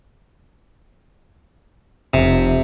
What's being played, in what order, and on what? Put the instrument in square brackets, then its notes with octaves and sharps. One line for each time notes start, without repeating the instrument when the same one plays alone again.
[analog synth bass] F1 [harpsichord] C3